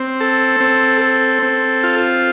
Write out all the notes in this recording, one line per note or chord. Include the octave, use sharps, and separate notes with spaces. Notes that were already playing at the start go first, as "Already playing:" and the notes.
Already playing: C4
A4
C4
A4
C4
F4